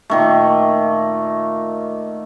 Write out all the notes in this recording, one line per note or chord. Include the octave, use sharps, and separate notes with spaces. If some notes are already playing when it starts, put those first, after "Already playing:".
A#2 D#3 A3